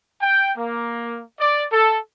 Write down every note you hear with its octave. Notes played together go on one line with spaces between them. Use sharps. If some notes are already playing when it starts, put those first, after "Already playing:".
G5
A#3
D5
A4